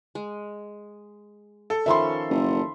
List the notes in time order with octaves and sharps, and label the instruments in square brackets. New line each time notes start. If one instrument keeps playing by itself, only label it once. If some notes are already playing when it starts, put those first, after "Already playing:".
[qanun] G#3
[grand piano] A4
[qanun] D#3 F3 C#4 [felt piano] E5 B5 C6
[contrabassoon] F#1